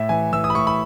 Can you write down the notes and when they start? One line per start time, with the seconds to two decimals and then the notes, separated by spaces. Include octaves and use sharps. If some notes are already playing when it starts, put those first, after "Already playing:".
Already playing: A2 E5
0.09 E3 G#5
0.32 E3 E6
0.44 D#6
0.50 B5
0.55 A2 C#6
0.67 B5